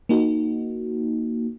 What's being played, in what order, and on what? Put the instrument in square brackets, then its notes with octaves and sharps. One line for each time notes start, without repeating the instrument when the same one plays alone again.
[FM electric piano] A#3 D#4 F#4